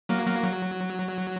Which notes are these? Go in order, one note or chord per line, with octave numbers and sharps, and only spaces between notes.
F#3 A#3
F#3 A#3
F#3